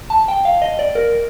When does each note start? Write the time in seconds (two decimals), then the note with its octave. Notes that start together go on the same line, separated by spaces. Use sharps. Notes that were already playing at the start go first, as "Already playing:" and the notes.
0.10 A5
0.28 G5
0.45 F5
0.62 D#5
0.79 D5
0.95 A#4